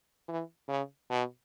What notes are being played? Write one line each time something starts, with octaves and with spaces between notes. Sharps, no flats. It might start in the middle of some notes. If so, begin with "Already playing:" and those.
E3
C#3
B2